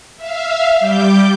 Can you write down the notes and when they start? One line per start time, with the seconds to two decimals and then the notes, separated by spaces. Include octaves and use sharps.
0.17 E5 F5
0.80 G3 D6 G6